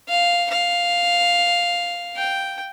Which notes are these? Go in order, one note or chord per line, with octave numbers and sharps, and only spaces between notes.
F5
F5
G5